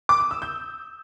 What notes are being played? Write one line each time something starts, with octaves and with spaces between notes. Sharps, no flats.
D6
D#6
E6
G6